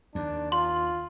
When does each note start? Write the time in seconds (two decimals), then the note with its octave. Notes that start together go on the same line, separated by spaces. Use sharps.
0.15 D#2 D4
0.52 F4 C6